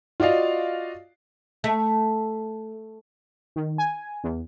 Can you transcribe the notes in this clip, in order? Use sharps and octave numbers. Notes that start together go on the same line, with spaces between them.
F4 F#4 D5 D#5 F5
A3
D#3
G#5
E2